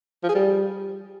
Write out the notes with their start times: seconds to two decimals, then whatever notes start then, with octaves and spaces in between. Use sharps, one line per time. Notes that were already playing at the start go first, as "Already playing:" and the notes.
0.23 F3
0.29 G#4
0.35 G3